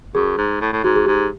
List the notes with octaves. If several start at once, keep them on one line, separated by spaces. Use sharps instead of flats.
F#2 G#4
G#2
A2
A2
G#2 F#4
G#4
G#2 G4